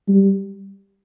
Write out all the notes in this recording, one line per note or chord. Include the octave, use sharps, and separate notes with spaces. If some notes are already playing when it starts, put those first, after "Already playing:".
G3